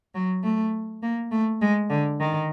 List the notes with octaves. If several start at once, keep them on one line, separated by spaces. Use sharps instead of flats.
F#3
A3
A#3
A3
G#3
D3
D#3